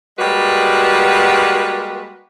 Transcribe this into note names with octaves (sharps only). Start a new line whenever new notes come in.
G3 G#3 A#3 F#4 B4